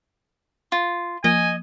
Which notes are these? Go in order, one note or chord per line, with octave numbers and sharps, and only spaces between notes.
F4
F3 A#3 D#5 G#5